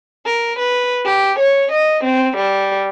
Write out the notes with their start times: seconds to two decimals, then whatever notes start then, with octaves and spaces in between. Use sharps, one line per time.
0.26 A#4
0.58 B4
1.05 G4
1.39 C#5
1.72 D#5
2.03 C4
2.36 G3